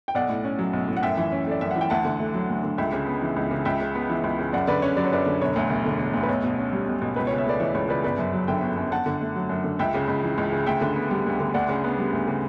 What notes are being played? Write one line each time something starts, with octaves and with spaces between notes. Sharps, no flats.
G5
B1 D5 F#5
A2
C#4
F#3
B1
A2
F#5
F#2 E5 G5
E3
C#4
A3 D5
F#2 E5
E3 F#5
G5
D2 F#5 A5
D3
A3
F#3
D2
D3
C#2 E5 G5
C#3
B3
E3
C#2
C#3
C#2 E5 G5
C#3
B3
E3
C#2
C#3
F#2 D5 F#5
D3 B4 D5
C#4 C#5
F#3 D5
C#5
F#2 B4 D5
D3
E1 C#5
D2
E1
D3
E1
D2
B4
B1 C#5
B2
C#4
G3
B1
B2
C#2 B4
C#5
C#3
C#5 E5
A3 B4 D5
E3 C#5
C#2 C#5
C#3 B4 D5
G1 B4 D5
F#2
F#3
D3 E5 G5
G1
F#2
F#2 F#5 A5
D3
A3
F#3
F#2
D3
C#2 E5 G5
C#3
C#2
E3
C#2
C#3
D2 E5 G5
D3
B3
G3
D2
D3
D2 D5 F#5
C#3
B3
G3
D2
C#3